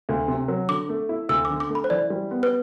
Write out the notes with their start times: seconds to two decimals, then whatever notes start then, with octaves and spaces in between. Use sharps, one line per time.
0.09 D2
0.28 C3
0.48 F#3
0.68 D3 D6
0.89 A3
1.09 E4
1.29 D2 E6
1.45 D6
1.50 D3
1.60 D6
1.70 A3
1.75 B5
1.84 C5
1.90 E3 D5
2.10 G3
2.31 B3
2.43 B4